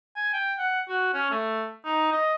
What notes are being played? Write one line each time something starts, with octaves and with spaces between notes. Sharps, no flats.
G#5
G5
F#5
F#4
C#4
A3
D#4
D#5